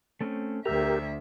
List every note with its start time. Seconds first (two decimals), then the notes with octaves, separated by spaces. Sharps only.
0.21 A3 C4 C#4
0.65 D2 G4 A#4 E5 A#5 E6